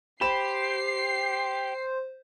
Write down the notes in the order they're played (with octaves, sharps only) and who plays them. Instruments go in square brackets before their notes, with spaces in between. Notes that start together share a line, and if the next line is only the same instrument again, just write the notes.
[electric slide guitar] G4 [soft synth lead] C5 [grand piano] B5 E7 [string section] C7